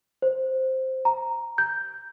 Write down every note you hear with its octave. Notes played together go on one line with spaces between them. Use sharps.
C5
A#5
G6